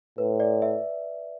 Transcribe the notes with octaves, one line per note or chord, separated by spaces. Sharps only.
A2 B4
D5
E5